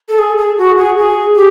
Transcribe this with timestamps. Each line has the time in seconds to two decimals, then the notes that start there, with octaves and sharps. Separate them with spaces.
0.08 A4
0.18 G#4
0.38 G#4
0.57 F#4
0.77 G#4
0.97 G#4
1.35 G4